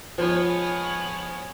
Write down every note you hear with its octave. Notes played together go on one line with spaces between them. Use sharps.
F3 G#3 B3 C#5